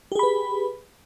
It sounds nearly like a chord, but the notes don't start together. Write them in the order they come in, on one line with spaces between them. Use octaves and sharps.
G4 G#4 B5 B4